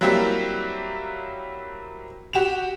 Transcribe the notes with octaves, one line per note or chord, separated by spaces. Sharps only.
F#3 G3 A#3 C4 E4 G4
F#4 G4 E7 F7